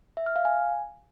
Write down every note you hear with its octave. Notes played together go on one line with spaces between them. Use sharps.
E5
F6
F5
G#5